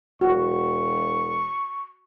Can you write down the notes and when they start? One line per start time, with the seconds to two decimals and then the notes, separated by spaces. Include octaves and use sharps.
0.21 E1 F#4 C#6